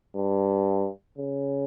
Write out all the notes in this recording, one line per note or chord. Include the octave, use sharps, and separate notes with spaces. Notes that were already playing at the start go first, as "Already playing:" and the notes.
G2
C#3